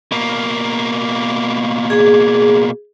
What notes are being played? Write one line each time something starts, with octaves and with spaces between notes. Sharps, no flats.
B2 A#3
G#4